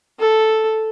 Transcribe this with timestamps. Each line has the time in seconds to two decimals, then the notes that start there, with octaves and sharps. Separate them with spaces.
0.19 A4